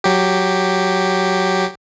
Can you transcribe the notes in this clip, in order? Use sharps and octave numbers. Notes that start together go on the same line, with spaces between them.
F#3 G4